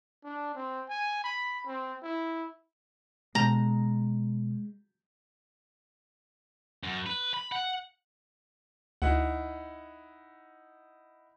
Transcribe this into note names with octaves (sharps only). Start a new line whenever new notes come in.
D4
C4
G#5
B5
C4
E4
B2 G#3 A#5
F#2
B4
B5
F#5
D2 D#4 E4 F#5